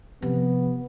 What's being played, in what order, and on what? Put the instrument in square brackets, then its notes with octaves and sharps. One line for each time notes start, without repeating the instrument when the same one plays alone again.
[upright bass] C3 F3 [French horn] B3